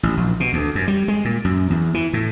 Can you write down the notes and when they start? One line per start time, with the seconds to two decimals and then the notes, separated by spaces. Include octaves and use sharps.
0.03 A1
0.17 A#1
0.40 B2
0.53 D2
0.75 F#2
0.88 G3
1.08 G#3
1.25 A#2
1.45 F#2
1.70 E2
1.94 E3
2.13 A2